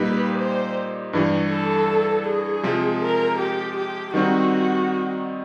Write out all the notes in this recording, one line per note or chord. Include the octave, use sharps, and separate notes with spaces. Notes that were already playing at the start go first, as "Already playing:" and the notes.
Already playing: A#2 G3 A#3 D#4 G4 B4
C5
G2 E3 G3
A4
G#4
C3 F3 G#3
A#4
G4
G4
D#3 G3 C4 D#4 F#4